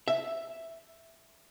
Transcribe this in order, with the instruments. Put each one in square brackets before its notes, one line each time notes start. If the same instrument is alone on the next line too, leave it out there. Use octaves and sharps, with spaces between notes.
[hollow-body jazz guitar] E5